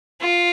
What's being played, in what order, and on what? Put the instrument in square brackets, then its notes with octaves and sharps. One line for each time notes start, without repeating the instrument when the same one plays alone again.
[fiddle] F4